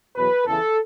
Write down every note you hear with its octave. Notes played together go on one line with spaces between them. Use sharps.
E2 B2 F#3 B4
E2 C#3 E3 A4